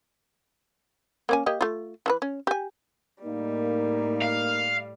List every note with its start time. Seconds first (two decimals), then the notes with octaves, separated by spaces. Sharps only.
1.29 A#3 C#4 G#5
1.46 A#3 G4 D#5
1.61 A3 F4
2.06 E3 A4 B4
2.22 C#4
2.47 G4 G#5
3.23 A2 G3 A#3 D#4
4.22 F5